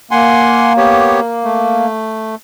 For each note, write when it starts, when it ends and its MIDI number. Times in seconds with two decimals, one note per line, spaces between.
0.11 1.86 58
0.11 0.73 78
0.11 0.73 80
0.11 0.73 84
0.77 1.20 59
0.77 1.20 67
0.77 1.20 73
1.44 2.35 57